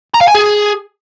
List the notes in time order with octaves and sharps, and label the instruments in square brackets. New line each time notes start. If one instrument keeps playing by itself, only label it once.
[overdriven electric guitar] A#5
F5
G#5
G#4